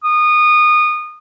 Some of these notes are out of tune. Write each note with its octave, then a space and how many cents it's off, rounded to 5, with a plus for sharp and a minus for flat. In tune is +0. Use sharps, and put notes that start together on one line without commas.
D#6 -25